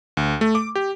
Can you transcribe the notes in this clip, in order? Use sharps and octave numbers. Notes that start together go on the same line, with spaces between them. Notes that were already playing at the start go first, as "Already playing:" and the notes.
D2
A3
D6
G4